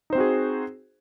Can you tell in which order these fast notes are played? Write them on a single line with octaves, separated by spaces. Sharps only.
D#4 C5 C4 F#4 G#4